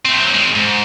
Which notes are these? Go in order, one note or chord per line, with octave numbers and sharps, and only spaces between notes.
A3 C4
F#3 C4
D#3 G#3
G#2